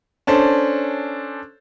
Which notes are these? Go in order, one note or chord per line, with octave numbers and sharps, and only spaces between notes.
C#4 D4 A4 C5